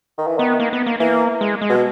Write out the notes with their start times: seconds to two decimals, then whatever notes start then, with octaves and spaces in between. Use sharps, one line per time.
0.18 D#3
0.27 E3
0.38 D#3 B3
0.60 A#3
0.73 B3
0.86 A#3
1.00 E3 A#3
1.41 G#3
1.61 G#3
1.70 B2